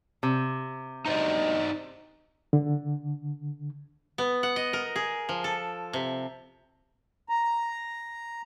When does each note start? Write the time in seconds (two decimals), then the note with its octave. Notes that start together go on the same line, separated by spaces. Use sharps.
0.23 C3
1.06 D2 G2 D#4 C5 D5 D#5
2.53 D3
4.18 B3
4.43 F#5
4.56 D#5
4.73 A#4
4.96 G#4
5.29 F3
5.44 A4
5.93 C3
7.29 A#5